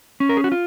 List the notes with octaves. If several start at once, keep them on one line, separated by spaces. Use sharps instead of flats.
C#4
A#4
G#4
F#4
F4